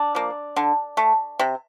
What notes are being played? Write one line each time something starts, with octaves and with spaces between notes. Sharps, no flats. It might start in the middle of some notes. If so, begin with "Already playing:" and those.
Already playing: D4
F3 A#3
D3
A3
C3